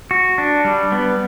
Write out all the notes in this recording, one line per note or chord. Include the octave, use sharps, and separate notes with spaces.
F#4
D4
G3
B3